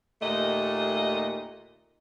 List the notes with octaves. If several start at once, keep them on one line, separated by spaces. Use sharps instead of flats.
D#2 A#2 A3 D#5